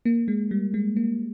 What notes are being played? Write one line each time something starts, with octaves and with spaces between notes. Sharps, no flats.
A#3
G#3
G3
G#3
A#3